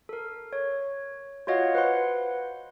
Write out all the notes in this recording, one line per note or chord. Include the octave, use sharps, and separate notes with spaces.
A4 A#4
C#5
F4 F#4 C#5 D#5 F5 F#5
B4 C5 F#5 C6